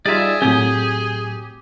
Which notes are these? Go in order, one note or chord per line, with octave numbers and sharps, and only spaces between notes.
G3 D#4 F4 G#4 D5 E5
A2 F#3 C4 G4 D#6